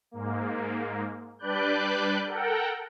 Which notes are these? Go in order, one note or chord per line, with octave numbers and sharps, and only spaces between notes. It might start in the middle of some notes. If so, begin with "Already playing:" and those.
G#2 A#3
G3 D4 B4 D5 F#6 G6
A4 A#4 F#5 G5